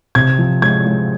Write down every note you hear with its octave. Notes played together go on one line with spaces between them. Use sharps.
C3 G#6
F3
G#3 G#6
G#3